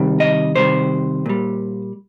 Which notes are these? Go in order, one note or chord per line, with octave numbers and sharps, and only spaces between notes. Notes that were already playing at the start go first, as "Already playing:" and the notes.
Already playing: C3 D#3 G3
D#5
C3 D#3 G3 C5
A#2 G3